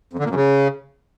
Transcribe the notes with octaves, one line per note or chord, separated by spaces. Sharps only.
F2
D3
A#2
F#2
C#3